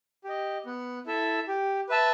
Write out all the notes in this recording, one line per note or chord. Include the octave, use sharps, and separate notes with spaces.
G4 D#5
B3
E4 A4 E5
G4
B4 E5 A5